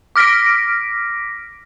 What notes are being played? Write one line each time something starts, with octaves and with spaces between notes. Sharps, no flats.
D6 F6 A#6 B6 D7